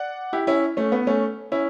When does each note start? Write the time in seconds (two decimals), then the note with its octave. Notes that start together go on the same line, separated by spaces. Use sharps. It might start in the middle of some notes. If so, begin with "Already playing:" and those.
Already playing: D5 F#5
0.33 E4 G4
0.47 C#4 E4
0.77 A3 C#4
0.92 B3
1.07 A3 C#4
1.52 C#4 E4